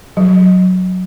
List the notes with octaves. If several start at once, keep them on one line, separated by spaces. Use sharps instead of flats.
F#3